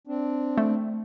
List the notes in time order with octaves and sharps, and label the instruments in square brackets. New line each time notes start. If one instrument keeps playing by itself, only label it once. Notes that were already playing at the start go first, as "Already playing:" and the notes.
[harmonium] C4 D4
[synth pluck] A3